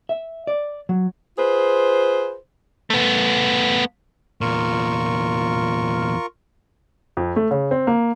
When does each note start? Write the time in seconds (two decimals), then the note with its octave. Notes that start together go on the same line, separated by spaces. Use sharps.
0.09 E5
0.47 D5
0.89 F#3
1.37 F4 G#4 B4 C5
2.90 A3 B3
4.41 E2 A#2 F4 A#4 C#6
7.17 F2
7.36 A3
7.51 C#3
7.71 C4
7.87 A#3